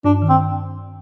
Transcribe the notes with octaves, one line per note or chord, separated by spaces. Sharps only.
G2 D4
D#3
C4